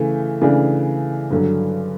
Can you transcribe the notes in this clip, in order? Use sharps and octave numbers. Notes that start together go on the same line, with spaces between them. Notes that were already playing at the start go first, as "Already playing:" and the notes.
Already playing: C#3 E3 A3
C#3 E3 A3 D4
G2 D3 F#3